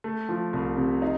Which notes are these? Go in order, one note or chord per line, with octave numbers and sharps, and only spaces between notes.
A3
F3
C2
C3
D#4